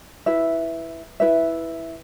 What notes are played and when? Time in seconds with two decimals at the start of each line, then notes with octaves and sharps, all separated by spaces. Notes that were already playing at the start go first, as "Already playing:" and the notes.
0.26 E4 B4 E5
1.20 E4 B4 E5